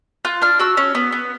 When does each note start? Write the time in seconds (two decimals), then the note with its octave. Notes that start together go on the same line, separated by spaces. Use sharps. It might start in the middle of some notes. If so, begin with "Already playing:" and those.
0.25 F4 F#6
0.42 D4 F6
0.59 F#4 E6
0.77 C#4
0.95 B3
1.12 B3